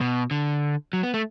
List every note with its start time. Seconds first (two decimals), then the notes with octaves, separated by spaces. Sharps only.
0.01 B2
0.31 D3
0.93 F#3
1.03 B3
1.14 A3